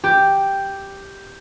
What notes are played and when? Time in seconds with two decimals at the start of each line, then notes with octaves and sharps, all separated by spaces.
0.04 G4